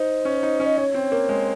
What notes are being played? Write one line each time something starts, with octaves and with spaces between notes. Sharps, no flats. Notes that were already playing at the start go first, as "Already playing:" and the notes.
Already playing: D#4 C5
C#4
D#4
C#4
D#5
C#4 C#5
C4
A#3
G#3